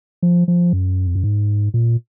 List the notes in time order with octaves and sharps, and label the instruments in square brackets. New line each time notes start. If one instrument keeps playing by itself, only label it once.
[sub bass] F3
F3
F#2
F2
F#2
G#2
A#2